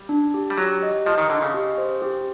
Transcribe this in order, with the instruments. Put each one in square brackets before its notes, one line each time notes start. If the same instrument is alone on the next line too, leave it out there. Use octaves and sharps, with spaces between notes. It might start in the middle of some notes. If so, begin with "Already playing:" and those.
Already playing: [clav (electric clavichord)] G3
[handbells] D4
G4
[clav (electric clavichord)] G3
[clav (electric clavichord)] F#3 [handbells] G4
[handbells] D#5
[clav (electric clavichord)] F3 [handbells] D#5
[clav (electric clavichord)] D#3
[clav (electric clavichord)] D3 [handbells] D#5
[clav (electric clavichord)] C#3
[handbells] G4
C5
G4